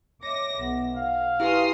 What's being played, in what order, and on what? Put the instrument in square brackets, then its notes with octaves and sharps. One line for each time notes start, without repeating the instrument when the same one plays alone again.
[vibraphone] C#5 D#5 E5 [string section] D6 A#6
[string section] B1 [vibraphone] B3 E5 F#5
[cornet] F5 [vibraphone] F#5
[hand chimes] E4 G4 [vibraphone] B4 G#5 [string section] C6 D#6 F6